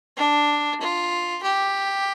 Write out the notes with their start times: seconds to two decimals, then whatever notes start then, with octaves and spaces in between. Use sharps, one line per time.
0.17 D4
0.81 F4
1.43 G4